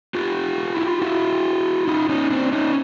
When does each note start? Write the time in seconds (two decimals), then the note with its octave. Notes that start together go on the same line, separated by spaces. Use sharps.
0.15 F4 G4
0.74 E4
0.88 F4
1.02 E4 F#4
1.88 D#4 F4
2.09 C#4 D#4
2.31 C4 D4
2.53 C#4 D#4